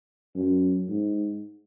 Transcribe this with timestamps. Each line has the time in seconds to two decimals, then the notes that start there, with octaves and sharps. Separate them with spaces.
0.35 F#2
0.89 G#2